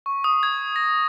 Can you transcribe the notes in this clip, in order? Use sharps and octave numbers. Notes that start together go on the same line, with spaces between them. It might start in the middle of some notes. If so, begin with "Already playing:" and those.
C#6
D#6
G#6
A#6